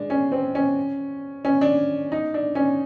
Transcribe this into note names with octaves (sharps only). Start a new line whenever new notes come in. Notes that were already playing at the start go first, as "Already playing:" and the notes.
Already playing: G#3 D4
C#4
C4
C#4
C#4
D4
D#4
D4
C#4